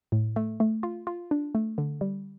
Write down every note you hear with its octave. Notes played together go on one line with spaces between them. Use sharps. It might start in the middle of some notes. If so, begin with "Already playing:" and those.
A2
A3
A3
F4
F4
D4
A3
D3
G3